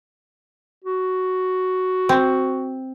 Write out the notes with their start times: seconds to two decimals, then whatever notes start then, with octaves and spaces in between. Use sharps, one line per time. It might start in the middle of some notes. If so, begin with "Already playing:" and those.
0.84 F#4
2.09 C4